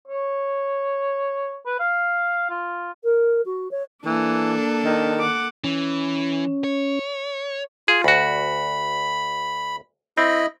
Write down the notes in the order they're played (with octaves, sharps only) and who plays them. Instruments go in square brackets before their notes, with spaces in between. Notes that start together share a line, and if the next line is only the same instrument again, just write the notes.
[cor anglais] C#5
B4
F5
F4
[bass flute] A#4
F#4
C#5
[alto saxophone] E3 [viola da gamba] A#3 A4 [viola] D4
[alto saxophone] D#3
[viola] F#5 D6
[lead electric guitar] E3 [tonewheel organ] C#4
[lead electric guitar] C#5
[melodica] F4 [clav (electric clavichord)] G#4
[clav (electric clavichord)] D2 F#4 [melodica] B5
[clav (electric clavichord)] C4 [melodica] E4 D#5 B5